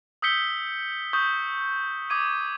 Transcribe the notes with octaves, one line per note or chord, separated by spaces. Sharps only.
D#6 E6 G6 B6 C#7 G7
C#6 D#6 G6
D6 D#6 G#6 D#7